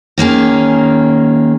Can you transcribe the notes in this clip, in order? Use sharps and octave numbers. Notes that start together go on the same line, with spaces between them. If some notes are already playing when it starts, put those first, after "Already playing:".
D#3 A#3 C#4 G#4